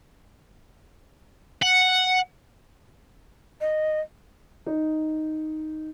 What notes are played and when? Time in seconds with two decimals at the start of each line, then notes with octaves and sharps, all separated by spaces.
1.63 F#5
3.61 D#5
4.67 D#4